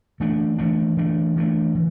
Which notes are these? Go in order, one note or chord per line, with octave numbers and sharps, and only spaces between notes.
E3 A3 D4
E3 A3 D4
E3 A3 D4
E3 A3 D4
E3